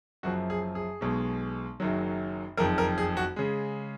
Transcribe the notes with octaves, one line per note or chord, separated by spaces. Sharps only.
F#1 F#2 F3 F#4
G#4
G#4
B1 B2 G#3
F#1 F#2 D#3 F#3
F#1 F2 D#3 A#4
A#4
G#4
F#4
C#3 G#3